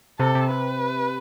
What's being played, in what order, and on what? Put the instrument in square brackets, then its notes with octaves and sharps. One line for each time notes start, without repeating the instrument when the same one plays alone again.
[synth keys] C3 [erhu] A4
[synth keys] C3
[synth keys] C3 [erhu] B4